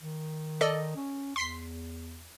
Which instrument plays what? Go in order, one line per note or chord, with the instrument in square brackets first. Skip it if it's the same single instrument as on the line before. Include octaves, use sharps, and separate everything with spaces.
[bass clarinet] D#3
[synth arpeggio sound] A4 D5 D#5
[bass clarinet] C#4
[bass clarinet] E2 [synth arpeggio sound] C6 B6 C7